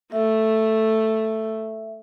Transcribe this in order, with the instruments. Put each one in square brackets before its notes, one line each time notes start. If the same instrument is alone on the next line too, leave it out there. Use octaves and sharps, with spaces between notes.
[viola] A3 [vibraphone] E5